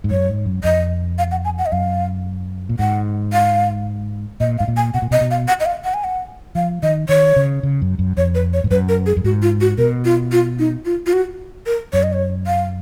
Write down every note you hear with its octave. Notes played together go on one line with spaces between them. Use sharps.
G#2
F#2 C#5
G#2
F#2
F2 D#5
F5
F#5
G#5
F#5
D#5
F#2 F5
A#2
G#2 F#5
F5
A#2 D#5
G#2 F5
A#2
G#5
B2 F#5
A#2
B2 D#5
B2
F5
F#5
D#5
F5
F#5
G#5
F#5
F3 F5
D#3 D#5
D#3 C#5
C#3
C#3
F#2
F#2
F2 C#5
B4
C#5
G#2
F#2 B4
A#4
G#4
F#2
G#2 F#4
F4
F#4
B2 A#4
F4
F4
D#4
F4
F4
F#4
A#4
F#2 C#5
D#5
C#5
F5